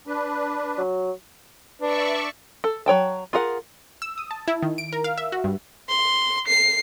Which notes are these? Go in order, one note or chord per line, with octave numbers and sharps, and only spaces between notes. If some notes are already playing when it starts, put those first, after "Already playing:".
D4 B4
F#3
D4 B4 D5 E5 C#6
A4
F#3 C#5 G5 A5
F4 G#4 A#4 F#5
E6
D#6
A5
E4
D#3
D7
A#4
F5
E5
F#4
G2
C6
C7